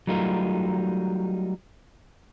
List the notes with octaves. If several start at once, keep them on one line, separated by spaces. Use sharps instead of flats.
F#3 G3 A3 D#4 F4 A#4